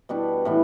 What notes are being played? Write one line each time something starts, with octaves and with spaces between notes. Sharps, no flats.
B2 G3 D4
A2 E3 B3